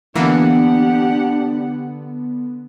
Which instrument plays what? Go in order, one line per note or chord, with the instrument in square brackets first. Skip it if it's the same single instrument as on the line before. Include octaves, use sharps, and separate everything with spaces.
[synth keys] D3 B3 [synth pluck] E3 A#3 [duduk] D4 [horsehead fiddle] G4 F#5